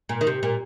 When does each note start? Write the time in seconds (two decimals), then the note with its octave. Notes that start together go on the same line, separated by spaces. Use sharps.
0.09 A#2
0.21 D#3
0.27 C3
0.43 A#2